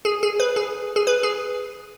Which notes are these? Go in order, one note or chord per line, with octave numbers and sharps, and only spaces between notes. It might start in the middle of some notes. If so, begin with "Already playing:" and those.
G#4
G#4
B4
G#4
G#4
B4
G#4